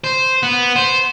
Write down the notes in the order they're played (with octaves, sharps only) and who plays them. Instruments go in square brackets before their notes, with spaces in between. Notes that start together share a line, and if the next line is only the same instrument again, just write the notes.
[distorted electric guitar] C5
B3
C5